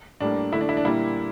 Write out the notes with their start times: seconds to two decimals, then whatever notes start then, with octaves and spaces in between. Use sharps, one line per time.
0.20 A2 G3 A#3 D4
0.52 D3 A3 E4
0.61 D4
0.69 E4
0.77 D4
0.85 A#2 G3 A#3 E4